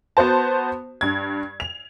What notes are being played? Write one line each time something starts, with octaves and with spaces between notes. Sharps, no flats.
B3 F#4 C5 A5
G2 G#6
F7